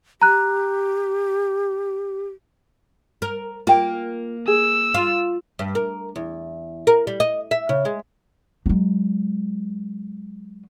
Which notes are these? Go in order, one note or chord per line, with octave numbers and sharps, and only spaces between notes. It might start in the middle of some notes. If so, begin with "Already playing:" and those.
G4 A#5 F#6
A#4
A#3 F4 G5
G#4 E6
F4
G2
A#4
E2
A#4
G3
D#5
E5
C#3
G#3
F#3 G#3